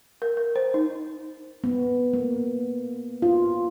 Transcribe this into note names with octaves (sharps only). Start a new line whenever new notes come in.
A#4
A#4
C5
D#4
B3
A#3
F4